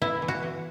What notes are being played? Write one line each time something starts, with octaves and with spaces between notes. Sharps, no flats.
B3 E4
E3
F#4
E3